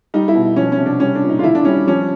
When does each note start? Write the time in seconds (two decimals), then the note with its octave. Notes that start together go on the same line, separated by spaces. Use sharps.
0.14 G3 D#4
0.28 E4
0.35 B2
0.56 F3 C#4
0.72 C#4
0.78 C3
0.86 D4
1.00 G3 C#4
1.15 D4
1.23 A#2
1.29 D#4
1.39 F4
1.44 D#3 E4
1.55 D4
1.65 G3 C#4
1.87 F3 C#4